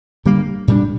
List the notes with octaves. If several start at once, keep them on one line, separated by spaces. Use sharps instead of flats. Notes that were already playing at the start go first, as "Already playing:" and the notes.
D3 G3 A#3
A#2 G3 D4